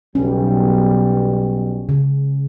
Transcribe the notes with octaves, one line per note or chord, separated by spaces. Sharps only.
B1 G3 C#4
C#3